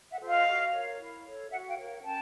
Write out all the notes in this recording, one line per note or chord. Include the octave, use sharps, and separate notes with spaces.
E5 F#5
F4 A4 C5
D#5 F5
F#4
A#4 C#5
E4
A4 C#5
F#4 E5 F#5
F5 G5
A#4 C#5
C#4 G5 A5